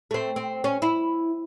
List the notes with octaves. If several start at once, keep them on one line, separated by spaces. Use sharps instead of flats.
A3 C4
C4
C#4
E4